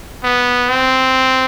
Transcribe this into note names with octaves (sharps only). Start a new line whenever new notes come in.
B3
C4